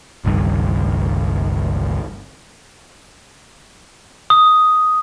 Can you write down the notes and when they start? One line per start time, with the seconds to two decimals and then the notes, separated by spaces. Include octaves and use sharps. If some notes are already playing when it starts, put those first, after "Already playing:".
0.24 G1 C#2 G2 D#3
4.30 D#6